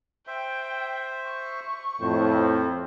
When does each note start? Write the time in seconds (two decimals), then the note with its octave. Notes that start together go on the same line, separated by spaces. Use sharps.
0.27 C5 E5 G5
1.26 C#6
2.01 F2 A2 C5